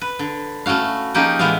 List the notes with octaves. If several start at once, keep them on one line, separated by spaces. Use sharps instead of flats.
B4
D3
A3 C#4 E4 F#4 F5
F3 A#3 C#4 D#4 G4 G#4
A2 E3 G#3 B3 E5 F5